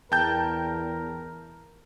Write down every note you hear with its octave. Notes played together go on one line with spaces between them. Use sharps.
E2 A#4 G5 A5 G6